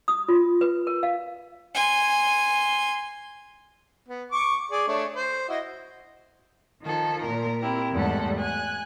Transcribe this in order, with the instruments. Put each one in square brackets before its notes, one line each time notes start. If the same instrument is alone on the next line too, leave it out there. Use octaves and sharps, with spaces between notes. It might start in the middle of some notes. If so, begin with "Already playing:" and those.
[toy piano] D#6
F4
B4
A#4
F5
[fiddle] G#5 C6
[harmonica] B3
C#6 D6
G#4 D5 D6
A3 D4 C#5
C5
E4 F#4 D#5
[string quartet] D#3 F3 A4
A#2 A#4
C4 E4 G4 A#4
E2 G#2 G3 A3 A4 F#5
G#5 F#6